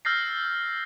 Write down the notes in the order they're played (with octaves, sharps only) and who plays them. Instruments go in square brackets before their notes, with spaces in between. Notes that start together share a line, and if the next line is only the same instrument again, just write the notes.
[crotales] E6 F6 G6 A6 A#6 C7